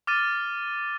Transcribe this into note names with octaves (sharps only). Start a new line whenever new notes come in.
D6 F6 A6 D#7